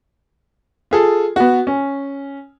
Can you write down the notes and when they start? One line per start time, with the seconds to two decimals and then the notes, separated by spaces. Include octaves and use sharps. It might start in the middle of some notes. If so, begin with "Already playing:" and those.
0.91 F4 G#4 A4
1.36 B3 F#4
1.67 C#4